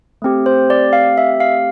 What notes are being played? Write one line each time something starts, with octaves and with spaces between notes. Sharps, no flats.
A3 C4 G4
C5
D5
F5
E5
F5